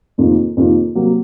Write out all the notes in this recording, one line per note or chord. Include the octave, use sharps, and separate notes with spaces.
F2 C3 D#3 A#3 F4
F2 C3 D#3 A#3 F4
C3 F#3 A#3